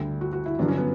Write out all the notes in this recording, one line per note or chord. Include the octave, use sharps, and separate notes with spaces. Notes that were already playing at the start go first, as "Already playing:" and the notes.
Already playing: D2 D3 G3
F#4
F#4
E4
G2 D3 F#3 D4
C#4
B3